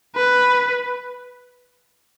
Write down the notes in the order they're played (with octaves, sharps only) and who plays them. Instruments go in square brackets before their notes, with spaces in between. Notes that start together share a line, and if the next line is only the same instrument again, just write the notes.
[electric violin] B4